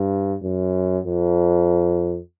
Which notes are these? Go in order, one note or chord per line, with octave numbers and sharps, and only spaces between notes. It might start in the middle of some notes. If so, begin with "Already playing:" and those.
Already playing: G2
F#2
F2